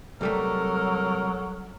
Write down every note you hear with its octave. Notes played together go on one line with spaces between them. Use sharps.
C2 F#3 G3 A3 A4 A#4